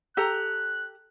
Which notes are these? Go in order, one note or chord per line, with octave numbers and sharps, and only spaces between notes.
G4 A4 A#5 F#6